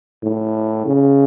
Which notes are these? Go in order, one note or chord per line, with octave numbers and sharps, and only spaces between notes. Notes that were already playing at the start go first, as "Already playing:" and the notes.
A2
C#3